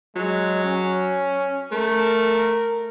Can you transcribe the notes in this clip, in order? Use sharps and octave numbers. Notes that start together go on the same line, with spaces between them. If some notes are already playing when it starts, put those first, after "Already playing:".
F#3 G#3
C#4
A3 A#4